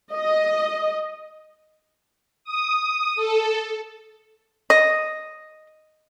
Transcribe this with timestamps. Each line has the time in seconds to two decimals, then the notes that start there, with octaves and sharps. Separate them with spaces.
0.13 D#5
2.44 D#6
3.16 A4
4.70 D#5